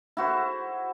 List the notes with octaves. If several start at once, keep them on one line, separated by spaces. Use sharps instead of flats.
E4 F#4 C5